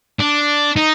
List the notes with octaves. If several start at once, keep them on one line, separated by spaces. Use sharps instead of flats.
D4
D#4